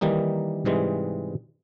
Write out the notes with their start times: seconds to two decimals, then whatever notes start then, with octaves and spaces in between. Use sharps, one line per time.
0.01 D#3 E3 G3 A#3 D#4
0.65 G#2 C3 E3 G3 G#3